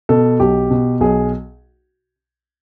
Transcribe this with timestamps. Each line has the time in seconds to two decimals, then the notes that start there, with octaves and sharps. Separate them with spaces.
0.09 B2 A4
0.40 B1 G4
0.70 B2
1.01 B1 G#4